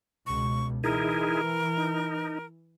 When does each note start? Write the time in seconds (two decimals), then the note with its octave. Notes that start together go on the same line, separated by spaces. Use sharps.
0.27 C#2 B2 C#6
0.84 E3 D#4 E4 G#4 A#4
1.78 D#4